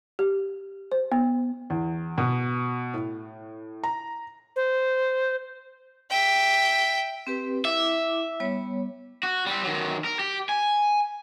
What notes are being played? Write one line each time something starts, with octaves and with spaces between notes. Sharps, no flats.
G4
C5
B3
E2
B2
A2
A#5
C5
E5 G5
C4 G4 B4
E4 E5 D6
G3 B3 C#5
F#4
G3 C4
D#3 F#3
A#4
G4
G#5